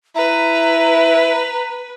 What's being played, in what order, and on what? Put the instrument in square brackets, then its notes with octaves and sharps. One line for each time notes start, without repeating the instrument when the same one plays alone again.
[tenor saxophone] E4 [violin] B4 [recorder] A#5